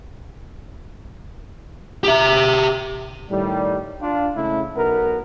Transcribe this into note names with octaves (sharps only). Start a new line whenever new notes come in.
G4 E5
A2 D#3 G3
D4 F4
C#3 G#3 A3 E4
B1 B3 A#4